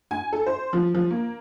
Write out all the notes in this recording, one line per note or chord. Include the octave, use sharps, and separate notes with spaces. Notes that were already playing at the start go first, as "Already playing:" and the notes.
G#5
A4
C5
F3
F3
A#3